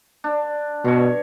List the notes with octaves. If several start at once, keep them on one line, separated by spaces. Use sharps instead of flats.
D4
G2 B2 C#5